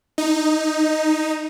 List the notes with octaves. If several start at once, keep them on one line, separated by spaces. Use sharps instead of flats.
D#4